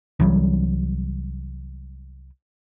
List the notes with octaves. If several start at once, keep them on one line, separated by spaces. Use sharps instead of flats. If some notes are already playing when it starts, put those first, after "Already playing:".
C2 E3 F#3 G3